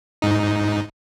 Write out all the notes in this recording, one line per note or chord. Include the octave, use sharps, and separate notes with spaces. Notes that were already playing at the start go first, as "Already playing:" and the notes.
G#2 D#4